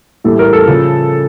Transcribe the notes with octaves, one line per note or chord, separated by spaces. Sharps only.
A2 E3 G3 A4
A#4
A4
C#3 F3